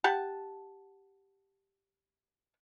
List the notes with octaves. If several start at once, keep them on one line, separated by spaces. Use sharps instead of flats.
G4 F#5 A5